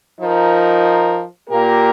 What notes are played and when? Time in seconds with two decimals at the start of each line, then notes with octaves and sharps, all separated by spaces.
0.19 F3 D#4 A#4
1.49 A#2 A#3 G4 A#4